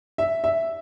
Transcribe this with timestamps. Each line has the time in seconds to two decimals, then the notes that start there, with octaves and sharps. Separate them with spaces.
0.18 E5
0.44 E5